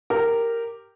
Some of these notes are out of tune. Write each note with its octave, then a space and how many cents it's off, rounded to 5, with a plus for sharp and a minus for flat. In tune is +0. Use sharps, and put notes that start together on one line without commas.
G4 +0 A#4 -10